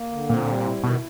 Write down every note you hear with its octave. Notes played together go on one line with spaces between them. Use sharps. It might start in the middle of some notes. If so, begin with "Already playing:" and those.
Already playing: A#3
D3
A#2 C4
G3
E4
B2 D#3